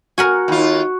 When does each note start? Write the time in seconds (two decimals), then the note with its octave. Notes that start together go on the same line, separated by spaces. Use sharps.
0.18 F#4 A#4 F#5 G#5
0.48 D#2 F4